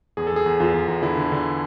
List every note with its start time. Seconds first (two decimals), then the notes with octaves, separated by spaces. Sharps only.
0.17 E2 G#4
0.27 A4
0.32 E2 G#4
0.46 E2
0.60 E2 F4
0.74 E2
0.88 E2
1.02 D3 E4
1.17 D3
1.32 D3